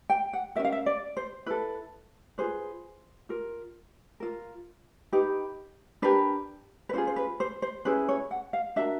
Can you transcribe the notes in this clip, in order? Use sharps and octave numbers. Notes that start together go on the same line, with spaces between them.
G5
F#5
C#4 F#4 A#4 E5
F5
E5
D5
C5
E4 A4 B4
F4 G#4 B4 C5
F4 A#4
F4 A#4
D#4 G4 B4
D4 G4 A#4 B4
B4
C#4 F4 G#4 C5
C5
B4
C5
C5
C#4 E4 G#4 B4 C5
C#5
F#5
F5
D4 F#4 A#4 E5